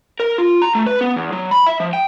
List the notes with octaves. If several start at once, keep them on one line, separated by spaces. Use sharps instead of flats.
A#4
F4
A#5
A3
B4
B3
E2
F#3
B5
E5
F3
G5